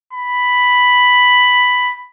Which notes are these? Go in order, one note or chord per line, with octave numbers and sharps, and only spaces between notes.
B5